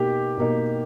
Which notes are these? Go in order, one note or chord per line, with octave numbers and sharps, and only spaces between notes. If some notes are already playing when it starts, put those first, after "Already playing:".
Already playing: B2 A#3 D#4 G4
B2 A#3 D#4